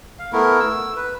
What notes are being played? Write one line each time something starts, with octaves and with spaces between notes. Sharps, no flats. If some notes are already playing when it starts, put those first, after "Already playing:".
F5
A3 B3 E4 A#4
E6
B4